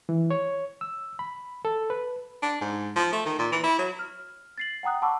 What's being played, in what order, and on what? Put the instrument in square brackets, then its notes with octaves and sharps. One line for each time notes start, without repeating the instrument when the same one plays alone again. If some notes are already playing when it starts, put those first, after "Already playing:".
[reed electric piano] E3
C#5
E6
B5
A4
B4
[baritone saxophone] D4
G#2
F3
A3
D#3
A#2
E3
E4
F#3
[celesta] F6
A6 C7 F#7
F#5 G5 A#5 D#6 F#6
F#5 A5 B5 C#6 D6 E6